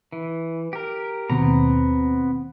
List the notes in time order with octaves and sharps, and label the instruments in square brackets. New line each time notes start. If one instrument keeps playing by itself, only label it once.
[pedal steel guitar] E3
G4 A#4
[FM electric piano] D#2 B2 [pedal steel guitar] B3 C4 A#5